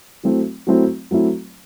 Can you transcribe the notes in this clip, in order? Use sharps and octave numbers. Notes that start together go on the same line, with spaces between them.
F#3 A3 C4 E4
F#3 A3 C4 E4
F#3 A3 C4 E4